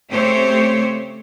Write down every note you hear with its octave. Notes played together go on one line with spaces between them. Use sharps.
C#3 A3 C4 G4 C5 C#5